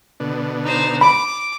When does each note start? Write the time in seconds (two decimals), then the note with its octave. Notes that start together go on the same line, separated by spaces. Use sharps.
0.20 B2 D3
0.64 D#4 C5
1.01 B5 D6